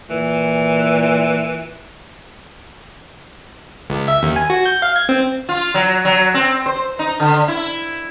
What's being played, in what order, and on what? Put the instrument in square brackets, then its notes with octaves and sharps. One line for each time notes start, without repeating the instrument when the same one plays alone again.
[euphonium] A#2 [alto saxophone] E3
[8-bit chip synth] C#2
E5
D#2
G#5
F#4
G6
F5
G#6
C4
[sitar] F4
F#3
F#3
C4
C5
D#4
D3
E4